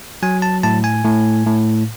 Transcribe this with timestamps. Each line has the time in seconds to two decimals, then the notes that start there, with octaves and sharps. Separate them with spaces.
0.23 F#3 G#5
0.42 A5
0.63 A2 A5
0.84 G#5
1.05 A2
1.46 A2